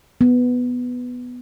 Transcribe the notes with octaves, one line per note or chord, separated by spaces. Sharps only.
B3